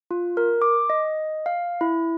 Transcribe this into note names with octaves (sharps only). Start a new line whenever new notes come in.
F4
A#4
D6
D#5
F5
E4